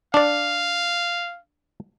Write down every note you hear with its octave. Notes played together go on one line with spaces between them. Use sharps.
D4 D5 F5